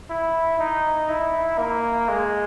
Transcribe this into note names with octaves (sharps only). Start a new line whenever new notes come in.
E4
D#4
E4
A#3
G#3